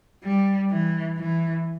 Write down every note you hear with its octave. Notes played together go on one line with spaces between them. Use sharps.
G3
E3
E3